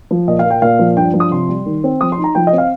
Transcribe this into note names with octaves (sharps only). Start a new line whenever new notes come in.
F3
A#2 D#5
F5
A#3
G5
A#2 F5
F3
G2 G5
F3
D#6
C3 C6
G3
D#3
C4
F3 D#6
C6
D#4
A#5
F3 G5
D#5
C4
F5